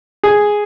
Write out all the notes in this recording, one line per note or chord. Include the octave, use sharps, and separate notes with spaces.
G#4